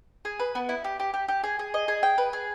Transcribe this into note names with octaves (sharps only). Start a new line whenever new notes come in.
G#4
B4
B3
E4
G4
G4
G4
G4
G#4
G#4
D#5
G#4
G5
B4
G#4